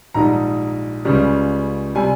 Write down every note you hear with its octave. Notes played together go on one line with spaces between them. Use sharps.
A#1 G#2 D#3 G3 A#5
C#2 C#3 G3
C3 G3 G#5